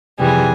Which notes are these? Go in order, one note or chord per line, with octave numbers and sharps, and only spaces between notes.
F2 C3 E3 G3 G#4